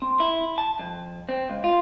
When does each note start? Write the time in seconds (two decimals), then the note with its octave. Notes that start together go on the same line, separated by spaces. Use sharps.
0.02 C4
0.20 E4
0.58 A5
0.79 F2
1.29 C4
1.50 C#2
1.64 F4